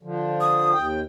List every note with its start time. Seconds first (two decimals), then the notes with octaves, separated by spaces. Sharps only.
0.03 D3 F3
0.40 D#6
0.73 D#2 G5